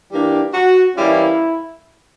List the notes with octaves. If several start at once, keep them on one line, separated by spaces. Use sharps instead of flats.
E3 G3 A#3 D4 G4
F#4
E3 G3 A#3 C#4 E4